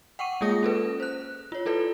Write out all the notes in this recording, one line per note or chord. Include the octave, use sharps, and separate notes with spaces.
F#5 G5 C#6 D6 D#7
G#3 A#3 F4 G#4 D#6 A#6
C#4 A4 B4
C5 F#6
F4 C#5
E4 A4 B4 D5